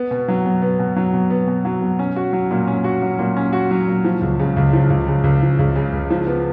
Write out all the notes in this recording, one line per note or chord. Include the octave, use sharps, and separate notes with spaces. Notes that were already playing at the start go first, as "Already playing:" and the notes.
Already playing: B3
B2
F#3
B2
B3
B2
F#3
B2
B3
B2
F#3
B2
C#4
F#4
F#3
A#2
C#4
F#4
F#3
A#2
C#4
F#4
F#3
A#2
F3
C#2
C#3
C#2
F3
C#2
C#3
C#2
F3
C#2
C#3
C#2
F3
B3